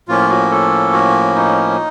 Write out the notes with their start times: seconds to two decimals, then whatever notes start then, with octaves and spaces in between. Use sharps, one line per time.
0.08 A2 F3 A#3 C#4 F4
0.30 F#4
0.51 A4
0.93 F#4
1.35 D#4